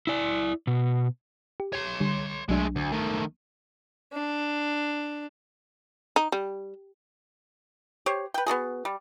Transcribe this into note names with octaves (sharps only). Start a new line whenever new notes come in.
E4 D5
B2
G4
C#5 C6
D3 G3
B1 F#3 G#3 A3 D4
D2
D#3 A3
D4
D#4
G3
G4 C5 C#5
B4 G5
B3 D4 F#4 G#4
G3